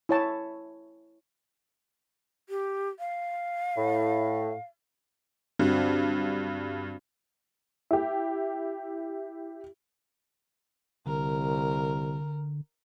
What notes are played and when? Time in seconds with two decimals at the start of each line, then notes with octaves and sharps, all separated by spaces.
0.09 E4 C#5 A5
2.49 G4
2.99 F5
3.77 A2
5.59 G2 C4 D4 F#4
7.91 E4 G4
11.06 C2 D3 A#4